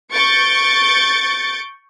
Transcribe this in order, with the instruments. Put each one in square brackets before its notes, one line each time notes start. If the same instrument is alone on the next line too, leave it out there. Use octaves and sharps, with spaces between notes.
[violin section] C#6 G6 A6 C#7 D7